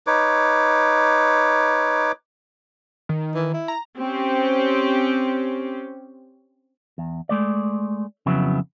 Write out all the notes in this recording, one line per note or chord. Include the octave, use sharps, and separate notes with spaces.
D#4 B4 C#5 D6
D#3
E3
E4
A#5
C4 C#4 G4
E2
G#3 A3 D5
F2 C#3 F#3 B3 E4